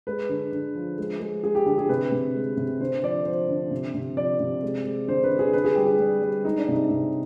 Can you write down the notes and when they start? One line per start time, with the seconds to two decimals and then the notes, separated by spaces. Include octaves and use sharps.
0.07 G#3 B4
0.29 D3
0.52 D3
0.75 F3
0.98 G#3
1.20 G#3
1.43 G#3 G#4
1.55 G4
1.66 D3 G4
1.78 G#4
1.89 C3 B4
2.12 C3
2.35 G#3
2.57 C3
2.80 D3 C5
3.03 F3 D5
3.25 F3 C5
3.49 D3
3.71 C3
3.94 C3
4.17 F3 D5
4.40 C3
4.63 G#3
4.85 G#3
5.08 D3 C5
5.24 B4
5.31 D3
5.39 G#4
5.53 D3 B4
5.64 G#4
5.75 G3 G4
5.86 G#4
5.99 G3
6.22 G3
6.45 G#3 D#4
6.58 D4
6.68 C3 D#4
6.90 C3